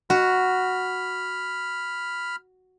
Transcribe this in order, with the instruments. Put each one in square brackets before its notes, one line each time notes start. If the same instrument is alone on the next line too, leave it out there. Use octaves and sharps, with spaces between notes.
[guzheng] F#4 [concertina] B5 F6